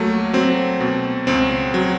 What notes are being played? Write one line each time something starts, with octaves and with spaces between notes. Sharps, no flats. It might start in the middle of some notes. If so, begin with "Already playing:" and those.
Already playing: C#2 F#3 A3 A#3
F#3 C4
B2
C#2 C4
F#3